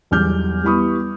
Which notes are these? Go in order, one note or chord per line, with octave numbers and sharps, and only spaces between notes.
B1 E2 G3 D6 F6 G6
G3 B3 E4 B5 C#6 D#6